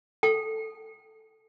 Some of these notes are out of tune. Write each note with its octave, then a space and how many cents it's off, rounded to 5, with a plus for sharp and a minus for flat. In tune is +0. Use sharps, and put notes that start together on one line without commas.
A4 +0 G5 -20